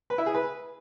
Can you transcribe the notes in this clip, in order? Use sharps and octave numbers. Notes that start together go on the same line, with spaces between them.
B4
E4
G#4
B4